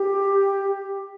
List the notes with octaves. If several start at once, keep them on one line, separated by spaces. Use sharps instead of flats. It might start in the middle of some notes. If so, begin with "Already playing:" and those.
Already playing: G4